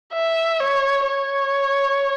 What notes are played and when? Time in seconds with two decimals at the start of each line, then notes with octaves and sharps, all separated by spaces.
0.13 E5
0.60 C#5
1.07 C#5